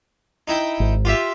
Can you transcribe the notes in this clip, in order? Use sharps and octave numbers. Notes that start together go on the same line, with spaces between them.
D#4 E4 G5
G#1
F4 G4 E5